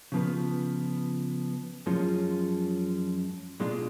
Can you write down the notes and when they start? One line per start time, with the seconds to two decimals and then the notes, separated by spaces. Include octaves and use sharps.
0.12 C#3 F3 B3 F4 B4
1.86 F#2 F3 G#3 C#4 F4
3.60 B2 G#3 D4 F4